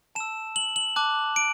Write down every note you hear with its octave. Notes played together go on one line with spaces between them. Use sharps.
A5 E6 E7
F#7
F#7
A5 D6 F#6
D7